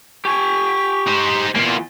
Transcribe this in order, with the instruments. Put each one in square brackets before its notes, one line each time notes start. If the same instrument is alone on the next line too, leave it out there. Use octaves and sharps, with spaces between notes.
[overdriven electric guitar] G4 G#5 [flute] C#6
[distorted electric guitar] D#4 C5
[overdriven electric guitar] E2 G#2 [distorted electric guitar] A#3 F4